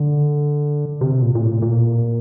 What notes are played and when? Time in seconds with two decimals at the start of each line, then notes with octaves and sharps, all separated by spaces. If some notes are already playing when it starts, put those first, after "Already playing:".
Already playing: D3
1.01 C3
1.22 A#2
1.35 A#2
1.42 A2
1.62 A#2